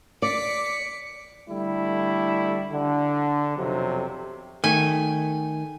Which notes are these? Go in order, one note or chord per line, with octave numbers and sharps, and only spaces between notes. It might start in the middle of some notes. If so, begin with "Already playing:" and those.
D5 D6 B6 C#7
D3 G3 A3 E4
D3
B1 F2 C3 F#3
D#3 A3 G#5